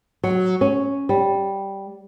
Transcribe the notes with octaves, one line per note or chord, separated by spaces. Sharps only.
F#3
C#4
G3